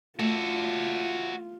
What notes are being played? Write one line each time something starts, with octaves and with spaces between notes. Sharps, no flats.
A3 F4 F#4 A4